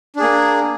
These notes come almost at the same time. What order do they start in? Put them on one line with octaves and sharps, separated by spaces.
D4 G#4 A#3